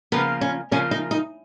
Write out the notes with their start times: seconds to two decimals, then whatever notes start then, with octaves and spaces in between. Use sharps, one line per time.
0.12 C#3 F3 A#3 B3 F4 A#4
0.41 C#4
0.71 C#3 F3 A#3 C#4 F4 A#4
0.91 D#4
1.11 D#4